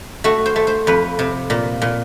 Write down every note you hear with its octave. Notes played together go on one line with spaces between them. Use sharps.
A3 F#4
C5
A3
C5
F2 B4
C3
A#2
A#2